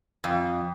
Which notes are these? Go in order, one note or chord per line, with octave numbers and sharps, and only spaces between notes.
F2